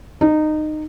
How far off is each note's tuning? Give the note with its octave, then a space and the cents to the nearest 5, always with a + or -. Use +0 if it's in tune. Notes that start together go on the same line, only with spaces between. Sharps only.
D#4 -20